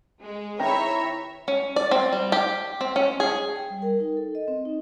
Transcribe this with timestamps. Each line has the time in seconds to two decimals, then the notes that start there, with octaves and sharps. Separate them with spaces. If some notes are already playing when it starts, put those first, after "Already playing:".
0.20 G#3
0.59 D#3 C4 E4 G4 B4 C#5 E5 A#5
1.48 C#4
1.76 D5
1.91 C4
2.13 G3
2.32 G4
2.81 C4
2.96 C#4
3.20 G#4
3.56 G5
3.70 G3
3.82 A#4
4.00 D#4
4.17 A4
4.35 D#5
4.48 C4
4.65 D#4